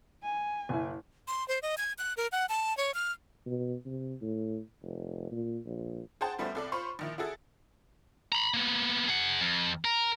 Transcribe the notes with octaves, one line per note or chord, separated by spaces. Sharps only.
G#5
F#1 E4
C6
C5
D#5
G#6
F#6
A#4
F#5
A5
C#5
F6
B2
C3
A2
F1
A#2
A#1
G#4 C5 F#5 G5 A5
F#2 G3 A3 B3 C5
C2 A4 D5
F4 C5 B5 C#6
A#1 D#3 E4
E4 F#4 G#4 A4 E5
A#5 B5
A#3 B3
G#4 F#5
F2
A#4